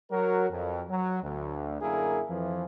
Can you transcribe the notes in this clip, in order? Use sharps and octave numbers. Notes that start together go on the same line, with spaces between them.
F#3 F#4 A#4
F2
F#3
D2
F#2 D3 A#3 E4 G#4 A#4
F2 E3 F3